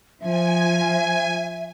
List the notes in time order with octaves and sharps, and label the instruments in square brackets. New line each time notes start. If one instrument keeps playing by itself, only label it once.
[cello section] F3 [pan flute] E5 [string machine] G#5